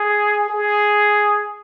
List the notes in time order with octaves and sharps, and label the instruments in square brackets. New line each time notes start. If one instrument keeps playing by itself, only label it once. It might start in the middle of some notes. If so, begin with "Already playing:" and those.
Already playing: [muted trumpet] G#4
G#4